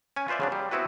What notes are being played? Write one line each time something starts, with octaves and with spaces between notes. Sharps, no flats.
C#4 G#5
F4 B4 C5 D5 E5
C#3 F#3 D4
G3
B3 C4 E4 F#4 B4